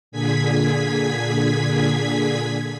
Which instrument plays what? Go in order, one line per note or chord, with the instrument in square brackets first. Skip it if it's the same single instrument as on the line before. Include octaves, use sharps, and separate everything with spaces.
[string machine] A#2 D3 G#4 G#6 B6